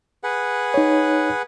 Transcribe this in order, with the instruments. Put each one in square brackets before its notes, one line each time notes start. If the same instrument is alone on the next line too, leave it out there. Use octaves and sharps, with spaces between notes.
[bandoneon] G#4 B4 F#5
[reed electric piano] D#4 C#5